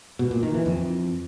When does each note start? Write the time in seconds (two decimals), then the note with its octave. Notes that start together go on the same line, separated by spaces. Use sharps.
0.19 B2
0.31 A#2
0.43 D#3
0.54 E3
0.66 F2